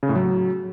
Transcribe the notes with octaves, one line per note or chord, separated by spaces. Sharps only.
C#3
A2
F#3